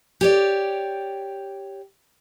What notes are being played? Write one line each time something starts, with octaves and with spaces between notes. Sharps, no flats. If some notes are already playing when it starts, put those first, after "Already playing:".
G4 C#5 D5